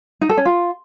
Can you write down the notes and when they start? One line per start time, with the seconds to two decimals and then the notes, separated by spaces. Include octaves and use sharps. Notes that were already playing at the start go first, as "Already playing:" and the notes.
0.21 D#4
0.29 A4
0.37 C#4
0.45 F4